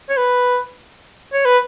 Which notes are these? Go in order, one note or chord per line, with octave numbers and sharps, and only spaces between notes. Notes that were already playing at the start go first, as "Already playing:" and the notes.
C#5
B4
C#5
B4